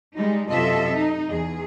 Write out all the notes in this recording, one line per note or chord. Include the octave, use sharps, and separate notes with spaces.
G3 G#3 D#4
F#2 C3 F4 A4 D#5 E5
D#4
E2 G#4